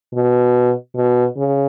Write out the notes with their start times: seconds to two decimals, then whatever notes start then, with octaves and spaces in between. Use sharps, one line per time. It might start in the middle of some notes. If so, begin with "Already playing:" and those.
0.14 B2
0.96 B2
1.37 C#3